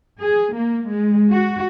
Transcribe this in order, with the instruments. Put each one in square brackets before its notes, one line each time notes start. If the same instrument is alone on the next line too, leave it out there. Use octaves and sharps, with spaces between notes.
[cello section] G#4
A#3
G#3
F#4